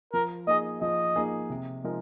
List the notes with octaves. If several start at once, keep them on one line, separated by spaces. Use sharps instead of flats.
F3 A#4
A#3 D#4 G#4 D#5
F3 D#5
A#3 D#4 G#4
C3
F3 G#3 D#4 A#4